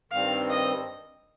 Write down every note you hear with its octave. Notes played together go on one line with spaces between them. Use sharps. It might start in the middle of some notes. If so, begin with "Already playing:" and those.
G2 D#3 G3 C4 F5
D#5